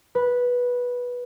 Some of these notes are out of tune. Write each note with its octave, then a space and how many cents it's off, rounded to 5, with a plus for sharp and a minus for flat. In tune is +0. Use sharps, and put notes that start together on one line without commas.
B4 -10